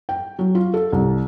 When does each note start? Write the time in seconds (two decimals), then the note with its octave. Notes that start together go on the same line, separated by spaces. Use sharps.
0.09 G5
0.39 F#3
0.55 F4
0.74 A4
0.93 C2